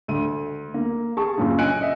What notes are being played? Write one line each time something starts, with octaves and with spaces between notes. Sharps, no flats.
D2 D#7
A#3
G#4 A5 C#6
F#2 A#2 C#3
D#5 G#5 F#6 C#7 D7
D#5 E5